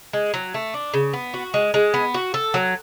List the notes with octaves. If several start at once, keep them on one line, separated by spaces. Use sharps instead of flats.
G#3
F#3
A3
D4
C#3
B3
F#4
G#3
G#3
B3
F#4
A4
F#3